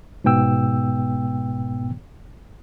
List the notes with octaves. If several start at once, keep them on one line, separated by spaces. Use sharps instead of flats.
G#2 B2 B3 G5 E6